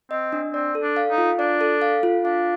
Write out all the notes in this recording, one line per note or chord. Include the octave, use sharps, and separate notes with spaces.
C4 D#5
D4
C4 D5
A4
D4
F5
D#4
F4
D4 D5
A4
F5
F4
D4 F5